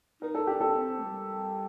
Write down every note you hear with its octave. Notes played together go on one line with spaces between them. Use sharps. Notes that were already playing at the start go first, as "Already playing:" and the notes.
D#4 A#4
A4
D4 G4
D#4 A4
D4
C4
A3
G3